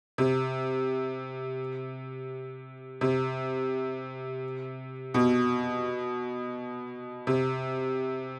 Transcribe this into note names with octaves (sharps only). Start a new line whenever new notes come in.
C3
C3
B2
C3